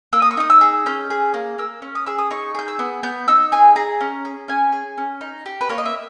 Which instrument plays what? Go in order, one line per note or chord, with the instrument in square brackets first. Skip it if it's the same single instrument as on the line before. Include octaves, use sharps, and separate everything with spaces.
[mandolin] A#3 E6
D#6
C#6
D#4 D#6
E6
G#4
C#4 G6
G#4
A#3
A#3 E6
C#4
D#6
G#4 E6
D#6
D#4 C#6
G#4 G6
E6
B3
B3 G6
D#4 E6
G#4 G#5
G#4 A#5
C#4
G#4
C#4 G#5
G#4
C#4
D#4
G4
B4
A#3 C#5
D#5
E5